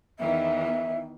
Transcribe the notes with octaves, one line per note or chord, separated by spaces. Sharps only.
E2 D#3 E3 E5